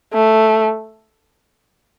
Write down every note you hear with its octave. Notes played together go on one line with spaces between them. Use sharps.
A3